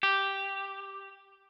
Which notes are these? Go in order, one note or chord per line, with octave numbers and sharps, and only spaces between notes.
G4